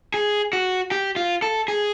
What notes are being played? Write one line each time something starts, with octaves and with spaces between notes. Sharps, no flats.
G#4
F#4
G4
F4
A4
G#4